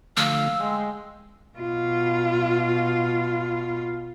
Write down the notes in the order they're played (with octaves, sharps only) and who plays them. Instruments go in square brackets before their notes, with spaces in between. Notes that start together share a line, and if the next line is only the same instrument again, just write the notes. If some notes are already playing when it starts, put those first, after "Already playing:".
[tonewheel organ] D3 F3 A3 [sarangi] F5 [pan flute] E6
[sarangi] G#3 [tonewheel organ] G5 C6
[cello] B2 F4